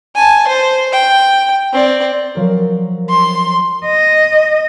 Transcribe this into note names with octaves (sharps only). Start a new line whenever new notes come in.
G#5 A5
C5
G5
C4 D5
F3 F#3 A#4
C6
D#5